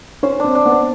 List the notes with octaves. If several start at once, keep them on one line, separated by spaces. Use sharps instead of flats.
C#4 C5
C4 D4
D4
B3
D4